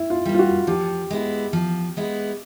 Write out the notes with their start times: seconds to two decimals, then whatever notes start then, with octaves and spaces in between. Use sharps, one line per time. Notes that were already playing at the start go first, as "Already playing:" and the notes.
Already playing: E4
0.10 F4
0.26 G3 A#3
0.34 F4
0.39 F#4
0.67 F3 G4
1.11 G#3 B3 E4
1.53 F3
1.97 G#3 B3 E4